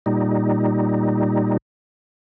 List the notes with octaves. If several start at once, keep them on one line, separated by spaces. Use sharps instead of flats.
A#2 G3 D#4